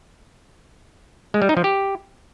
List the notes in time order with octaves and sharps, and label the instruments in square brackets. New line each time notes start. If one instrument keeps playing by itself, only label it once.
[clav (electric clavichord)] G#3
G3
D#4
F3
G4